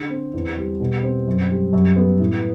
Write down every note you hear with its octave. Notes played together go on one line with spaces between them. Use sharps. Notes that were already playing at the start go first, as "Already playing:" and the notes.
Already playing: D3
C4
E2
G3
B2
C4
F#2
G3
F#2
B3
A2